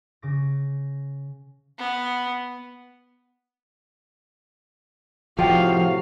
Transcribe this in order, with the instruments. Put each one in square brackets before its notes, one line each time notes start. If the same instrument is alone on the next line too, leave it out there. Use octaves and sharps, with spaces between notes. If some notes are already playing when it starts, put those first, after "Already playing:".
[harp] C#3 D6 A#6
[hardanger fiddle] B3
[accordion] A2 C3 F#4 [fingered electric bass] F3 [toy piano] G#4 G5 [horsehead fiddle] F5